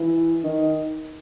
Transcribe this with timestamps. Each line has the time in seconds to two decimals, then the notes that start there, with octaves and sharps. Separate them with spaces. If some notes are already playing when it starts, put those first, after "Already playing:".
Already playing: E3
0.43 D#3